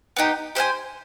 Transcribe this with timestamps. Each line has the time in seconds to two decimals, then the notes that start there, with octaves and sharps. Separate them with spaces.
0.16 B3 D#4 G4
0.55 G4 C5 F5 G#5